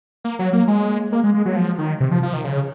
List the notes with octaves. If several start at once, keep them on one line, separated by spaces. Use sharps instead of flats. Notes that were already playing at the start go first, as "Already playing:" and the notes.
A#3
F#3
A#3
G#3
A#3
G#3
G#3
F#3
F3
D#3
C3
F3
F3
D#3
C#3